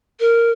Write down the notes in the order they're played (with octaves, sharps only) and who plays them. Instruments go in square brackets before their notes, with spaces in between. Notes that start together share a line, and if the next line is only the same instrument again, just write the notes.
[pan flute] A#4